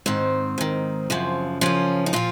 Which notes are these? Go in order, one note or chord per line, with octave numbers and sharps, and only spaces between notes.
G#2 D#3 C4
G#2 D#3
F#2 C#3 F3
F#2 C#3 F3 C#4
D#4
A#2 F3 F4